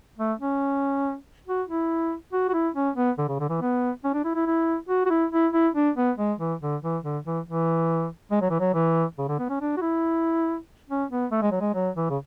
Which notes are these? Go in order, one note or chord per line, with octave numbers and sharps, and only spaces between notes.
A3
C#4
F#4
E4
F#4
F#4
E4
C#4
B3
D3
C#3
D3
E3
B3
C#4
D4
E4
E4
E4
F#4
F#4
E4
E4
E4
D4
B3
G#3
E3
D3
E3
D3
E3
E3
G#3
F#3
E3
F#3
E3
C#3
D3
B3
C#4
D4
F#4
E4
C#4
B3
A3
G#3
F#3
G#3
F#3
E3
C#3